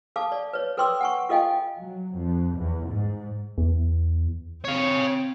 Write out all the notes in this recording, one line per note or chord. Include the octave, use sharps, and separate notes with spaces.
A4 F5 A5 D6
D5
B4 C#5
A4 B4 G5 C6 D6 E6
F#5 G#5 C#6
F4 A4 D#5 F5 G5 G#5
F#3
F2
E2
G#2
E2
C4 C#5 F5